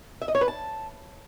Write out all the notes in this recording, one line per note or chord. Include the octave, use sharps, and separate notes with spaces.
E5
D#5
C#5
B4
A5